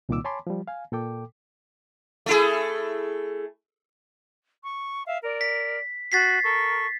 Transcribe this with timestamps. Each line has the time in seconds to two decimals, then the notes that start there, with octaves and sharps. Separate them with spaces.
0.09 C2 A#2 D#3 A#3 D6 E6
0.25 C#5 G#5 A5 B5 C6 D6
0.47 F3 G3
0.68 F5 G#5
0.92 A#2 A4 G5 D6
2.26 A3 E4 G#4
4.63 C#6
5.07 E5 F5
5.23 A#4 D5
5.41 B6
6.12 F#4 G#5 A6 B6 C7
6.43 A4 A#4 C#6